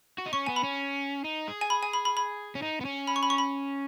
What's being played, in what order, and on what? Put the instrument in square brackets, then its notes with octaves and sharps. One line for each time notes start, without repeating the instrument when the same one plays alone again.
[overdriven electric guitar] F#4
D#4
[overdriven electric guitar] C#4 [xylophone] C#6
[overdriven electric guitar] B3 [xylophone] G#5
[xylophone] B5
[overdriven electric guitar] C#4
D#4
G#4
[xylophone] G#5
B5
G#5
B5
B5
B5
[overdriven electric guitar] C#4
D#4
B3
C#4
[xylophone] B5
C#6
B5
C#6
B5